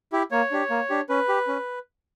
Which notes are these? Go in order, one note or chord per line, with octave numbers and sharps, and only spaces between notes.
E4 G4
A#3 C#5
D4 G4
A#3
D4 G4
C#4 B4
G4
C#4